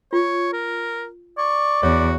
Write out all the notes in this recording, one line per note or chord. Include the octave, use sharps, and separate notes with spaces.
F4 C#5
A#4
D5 C#6
E2 F#4 C#5